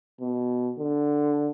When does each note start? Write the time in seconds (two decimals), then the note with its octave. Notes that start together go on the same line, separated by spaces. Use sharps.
0.20 B2
0.78 D3